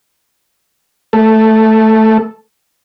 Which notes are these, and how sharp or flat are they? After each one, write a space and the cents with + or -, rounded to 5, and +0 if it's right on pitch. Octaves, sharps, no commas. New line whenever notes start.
A3 +0 A4 +0